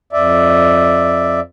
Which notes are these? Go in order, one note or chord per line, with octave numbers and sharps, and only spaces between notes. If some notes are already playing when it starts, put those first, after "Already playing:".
F2 D5 E5